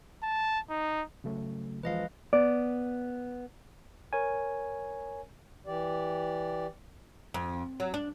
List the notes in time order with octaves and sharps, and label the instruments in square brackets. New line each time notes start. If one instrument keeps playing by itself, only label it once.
[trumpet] A5
D#4
[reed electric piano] C#3 F#3 A3
[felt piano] E1 F3 [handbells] B4 D#5 F5
[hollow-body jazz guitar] B3 D5
[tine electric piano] A#4 C#5 G#5
[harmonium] E3 G4 D5
[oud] F2
F#3
D4